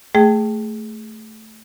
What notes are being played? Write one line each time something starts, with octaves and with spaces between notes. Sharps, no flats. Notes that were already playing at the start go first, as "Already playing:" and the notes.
A3 G#4 G5